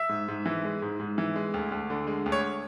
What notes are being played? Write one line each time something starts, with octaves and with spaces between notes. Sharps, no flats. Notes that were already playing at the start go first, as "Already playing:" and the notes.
Already playing: E5
G#2
G#2
E3
G#3
G#2
G#2
E3
G#3
D2
D2
D3
G#3
D2
C#5